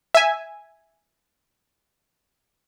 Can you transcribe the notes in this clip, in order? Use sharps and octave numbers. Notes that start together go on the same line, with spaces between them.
E5 G#5